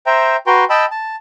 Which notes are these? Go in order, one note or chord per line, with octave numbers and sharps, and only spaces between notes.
C5 E5 G5 A#5
F#4 B4 G5 A#5 C6
D#5 G5 A5 B5 E6
A5